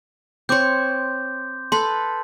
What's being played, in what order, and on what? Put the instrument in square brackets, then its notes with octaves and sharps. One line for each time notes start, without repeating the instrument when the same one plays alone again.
[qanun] C4 C#5 [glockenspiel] C6 D6 G6
[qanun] A4 B4 [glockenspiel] C6